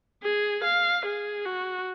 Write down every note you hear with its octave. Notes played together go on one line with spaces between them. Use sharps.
G#4
F5
G#4
F#4